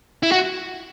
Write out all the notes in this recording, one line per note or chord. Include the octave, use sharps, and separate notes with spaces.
E4
F#4